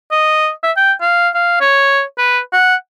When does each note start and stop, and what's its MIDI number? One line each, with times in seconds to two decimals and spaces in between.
0.11 0.50 75
0.63 0.72 76
0.77 0.93 79
1.01 1.29 77
1.35 1.59 77
1.61 2.02 73
2.18 2.40 71
2.53 2.75 78